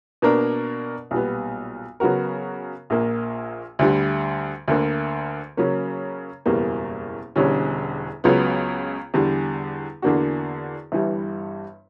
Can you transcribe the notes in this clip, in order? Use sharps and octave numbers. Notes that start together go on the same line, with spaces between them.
B2 A#3 D4 A#4
B1 A#2 G3 B3
C#3 F#3 B3 F#4 A#4
A#1 A#2 A#3
D2 D3 G3
D2 D3 A#3
C#3 F#3 A#3 C#4
F#1 E2 B2 G3 A#3
E1 E2 D3 G3 C#4
C#2 C#3 F#3 B3
E2 D3 G3
E2 D3 A#3 D4 F#4
G1 G2 E3 G3